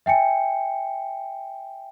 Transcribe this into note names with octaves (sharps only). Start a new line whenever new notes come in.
E5 G5 G#5 C#7